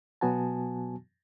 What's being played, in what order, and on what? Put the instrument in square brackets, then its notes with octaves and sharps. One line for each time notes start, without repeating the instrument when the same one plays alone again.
[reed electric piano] B2 F#3 B3 F#4 G#5 A5